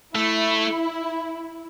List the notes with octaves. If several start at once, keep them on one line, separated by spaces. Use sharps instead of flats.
A3 E4